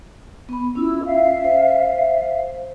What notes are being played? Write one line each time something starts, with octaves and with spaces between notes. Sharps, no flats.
B3 B5
C#4 E4 F4 E6
E5 F5
C5